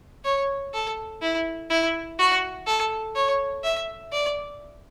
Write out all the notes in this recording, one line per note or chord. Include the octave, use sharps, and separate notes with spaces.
C#5
A4
E4
E4
F#4
A4
C#5
E5
D5